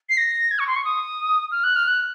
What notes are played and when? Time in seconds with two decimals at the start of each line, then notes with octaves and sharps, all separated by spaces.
0.09 C7
0.17 A#6
0.51 G#6
0.59 C#6
0.67 C6
0.76 C#6
0.85 D#6
1.52 F6
1.64 F#6
1.76 F6
1.88 F#6